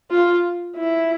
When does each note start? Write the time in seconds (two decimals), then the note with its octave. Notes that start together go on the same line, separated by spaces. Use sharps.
0.11 F4
0.76 E4